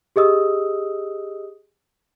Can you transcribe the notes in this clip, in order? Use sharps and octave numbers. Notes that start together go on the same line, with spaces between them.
G4 G#4 D#5 D#6 E6